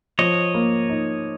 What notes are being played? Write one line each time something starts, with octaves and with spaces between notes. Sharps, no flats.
F3 C#5 D#5
A#3
D#4